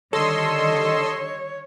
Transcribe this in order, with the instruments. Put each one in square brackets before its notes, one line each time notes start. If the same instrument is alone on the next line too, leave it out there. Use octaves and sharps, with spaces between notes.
[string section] D3 D#3 G3 [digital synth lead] A4 [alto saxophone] C#5 [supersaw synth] D#5 C6 E6